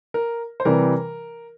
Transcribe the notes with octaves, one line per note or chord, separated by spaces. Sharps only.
A#4
C5
C3 E3 G3 A#4